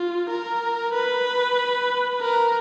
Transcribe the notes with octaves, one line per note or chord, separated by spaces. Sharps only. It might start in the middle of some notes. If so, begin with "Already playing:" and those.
Already playing: F4
A#4
B4
A#4